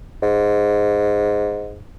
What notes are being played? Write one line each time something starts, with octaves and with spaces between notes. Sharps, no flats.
G#2